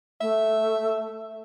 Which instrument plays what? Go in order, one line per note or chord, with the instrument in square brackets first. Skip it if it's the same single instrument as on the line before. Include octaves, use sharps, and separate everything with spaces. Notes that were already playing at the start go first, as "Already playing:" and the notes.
[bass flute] A3 [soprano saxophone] E5